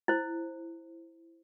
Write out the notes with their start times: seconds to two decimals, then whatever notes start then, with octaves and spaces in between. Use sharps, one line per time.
0.08 E4 C5